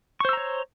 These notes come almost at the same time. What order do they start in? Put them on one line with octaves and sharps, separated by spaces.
C#6 C5 E6 A#5 C#5